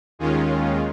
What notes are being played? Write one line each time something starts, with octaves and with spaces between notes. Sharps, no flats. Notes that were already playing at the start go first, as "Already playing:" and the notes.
D#2 D#3 G#3 C#4 F4